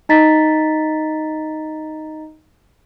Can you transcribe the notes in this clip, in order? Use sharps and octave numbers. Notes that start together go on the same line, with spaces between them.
D#4 D#5 A#5 A6 B6